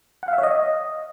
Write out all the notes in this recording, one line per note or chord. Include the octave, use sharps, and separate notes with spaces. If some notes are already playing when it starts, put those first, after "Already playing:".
F#5
F5
E5
C#5
D#5